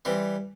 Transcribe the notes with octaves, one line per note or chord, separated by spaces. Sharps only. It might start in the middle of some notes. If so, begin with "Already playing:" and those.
E3 G3 C4